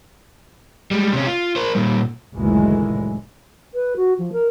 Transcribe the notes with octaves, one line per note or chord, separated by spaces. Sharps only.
G3 G#3
C3 C#4
F4
A#4 C5
A#2 G3
F#1 D2 A#2 D#3 E3 G#3
B4
F#4
F3
A#4